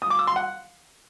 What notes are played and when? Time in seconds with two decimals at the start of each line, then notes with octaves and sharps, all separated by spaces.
0.02 D#6
0.10 D6
0.19 E6
0.27 C6
0.36 F#5